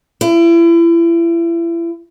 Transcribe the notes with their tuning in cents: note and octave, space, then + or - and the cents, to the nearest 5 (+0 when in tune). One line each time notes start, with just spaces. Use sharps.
E4 +35